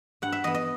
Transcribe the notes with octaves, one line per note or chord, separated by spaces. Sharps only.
G2 F#5
E5
E3 B3 D#5
D#5